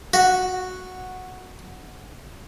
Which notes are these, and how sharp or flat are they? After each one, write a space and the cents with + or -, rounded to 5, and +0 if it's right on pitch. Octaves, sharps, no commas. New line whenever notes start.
F#4 -5